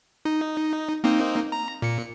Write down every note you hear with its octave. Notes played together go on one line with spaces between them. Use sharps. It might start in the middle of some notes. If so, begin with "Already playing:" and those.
D#4
A#3 C4 D#4
A#5
A#2 C#7